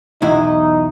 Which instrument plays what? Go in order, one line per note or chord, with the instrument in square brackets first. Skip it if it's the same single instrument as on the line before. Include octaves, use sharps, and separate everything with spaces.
[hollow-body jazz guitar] B1 E2 E4 [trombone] D#4